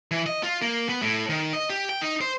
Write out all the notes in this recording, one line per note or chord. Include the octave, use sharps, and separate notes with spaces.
E3
D#5
F4
A#3
B3
A2
D#3
D#5
G4
G5
D#4
C5